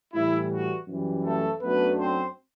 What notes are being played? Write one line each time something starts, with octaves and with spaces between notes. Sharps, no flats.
A2 E3 G3 E4
F#4
F#2 E3 G3
A3 A4
F#2 F#3 A3 B3 D4 B4
C4 C5